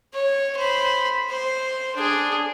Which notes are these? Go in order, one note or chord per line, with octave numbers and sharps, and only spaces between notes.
C#5
C5 B5
C5
D4 G#4